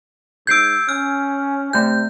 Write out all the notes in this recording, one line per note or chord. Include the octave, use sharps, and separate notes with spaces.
G#2 E6 G6 G#6 C7 D7
C#4 F6
C3 A3 G6